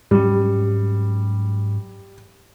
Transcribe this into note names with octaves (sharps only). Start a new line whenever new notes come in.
G#2 F#3 G3 C#4